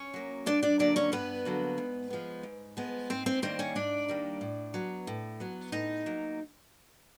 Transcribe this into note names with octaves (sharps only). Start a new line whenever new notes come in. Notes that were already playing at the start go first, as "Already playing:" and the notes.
Already playing: C#4 C#5
F#3 A#3
G2 D4 D5
D4 D5
D3 F#3 A#3 D4 D5
C#4 C#5
G2 B3 B4
D3 F#3 A#3
G#2
F3 G#3 B3
G#2
F3 G#3 B3
G#2 C4 C5
C4 C5
D#3 G3 A#3 C4 C5
C#4 C#5
G#2 D4 D5
D#3 G3 A#3
A2
F#3 B3
A2
F#3 B3
A2 D#4 D#5
F#3 A#3